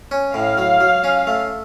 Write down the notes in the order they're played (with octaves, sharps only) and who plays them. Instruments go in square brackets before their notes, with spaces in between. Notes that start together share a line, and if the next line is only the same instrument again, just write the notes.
[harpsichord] C#4
[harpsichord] A2 [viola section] F5
[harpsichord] F#3
F#3
C#4
A3